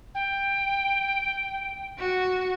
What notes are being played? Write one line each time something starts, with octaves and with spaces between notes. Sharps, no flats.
G5
F#4